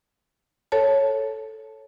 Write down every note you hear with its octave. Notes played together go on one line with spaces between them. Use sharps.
A4 C#5 A5